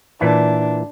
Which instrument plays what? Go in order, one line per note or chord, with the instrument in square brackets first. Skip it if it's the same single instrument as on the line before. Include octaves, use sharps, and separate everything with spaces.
[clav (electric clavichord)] A#2 E3 E4 [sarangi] D4